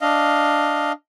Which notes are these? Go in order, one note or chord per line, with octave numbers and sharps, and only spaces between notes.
D4 D#5 F5